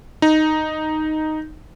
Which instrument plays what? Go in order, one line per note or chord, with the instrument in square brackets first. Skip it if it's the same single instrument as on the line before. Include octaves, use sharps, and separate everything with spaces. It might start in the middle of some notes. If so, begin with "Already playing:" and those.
[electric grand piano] D#4